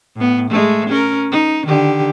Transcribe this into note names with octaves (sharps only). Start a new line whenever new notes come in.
A2 B3
G#3 A3
C#4 A#4
D#4
D3 D#3 G4